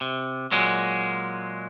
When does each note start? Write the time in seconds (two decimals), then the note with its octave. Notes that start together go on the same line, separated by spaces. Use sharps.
0.01 C3
0.52 A#2 F#3 G#3